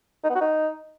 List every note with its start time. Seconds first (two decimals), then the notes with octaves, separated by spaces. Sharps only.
0.24 D#4
0.30 B3
0.35 F#4
0.41 D#4